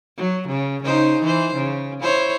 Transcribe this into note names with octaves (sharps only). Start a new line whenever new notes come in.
F#3
C#3
C#3 D#4 C5
E3 C5
C#3
E4 C5 C#5